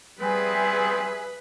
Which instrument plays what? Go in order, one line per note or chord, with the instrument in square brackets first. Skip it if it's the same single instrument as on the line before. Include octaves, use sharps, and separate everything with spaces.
[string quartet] G3 [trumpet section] B3 C4 [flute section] G#4 E5 [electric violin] B4